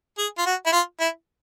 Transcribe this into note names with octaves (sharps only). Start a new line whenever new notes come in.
G#4
F4
F#4
E4
F4
E4